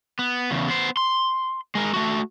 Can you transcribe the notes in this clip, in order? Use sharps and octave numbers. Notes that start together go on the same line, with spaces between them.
B3
E2 C#3
B3 C5
C6
G#3 A#4
A3 F#4